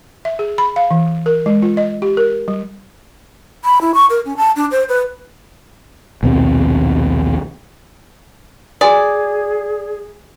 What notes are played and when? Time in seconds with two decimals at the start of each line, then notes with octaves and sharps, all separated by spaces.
0.25 E5
0.39 G#4
0.58 B5
0.76 F5
0.91 E3
1.26 A#4
1.46 G#3
1.62 F4
1.77 D#5
2.02 G4
2.17 A#4
2.48 G3
3.64 B5
3.81 E4
3.94 C#6
4.10 A#4
4.25 C#4
4.37 A5
4.56 D4
4.71 C5
4.89 B4
6.23 A#1 D#2 B2 C4
8.81 F#4 G#4 D5 G#5 D#6